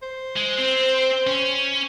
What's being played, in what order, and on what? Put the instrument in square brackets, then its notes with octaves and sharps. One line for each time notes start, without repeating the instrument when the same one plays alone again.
[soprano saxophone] C5
[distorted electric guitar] G#3
C4
C#4